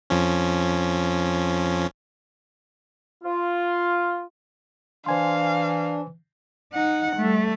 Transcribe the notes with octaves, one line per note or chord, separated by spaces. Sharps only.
F2 F3 C#4
F4
E3 D4 C5 F5 G#5 C6
D#4 F#5
G3 A3